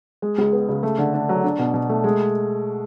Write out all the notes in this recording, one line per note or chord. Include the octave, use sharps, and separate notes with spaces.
G#3
C#2
B3
C#3
A3
D3
D4
F#3
D4
B2
B2
A3
G#3